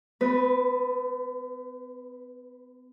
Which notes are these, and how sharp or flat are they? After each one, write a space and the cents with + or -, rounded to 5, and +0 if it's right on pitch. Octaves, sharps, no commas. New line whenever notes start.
B3 +45 B4 +0